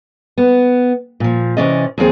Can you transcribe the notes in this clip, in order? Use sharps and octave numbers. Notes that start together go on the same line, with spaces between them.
B3
A#2 F3
C3 E3 C#4 D5 D#5
D#2 F3 C4 G#4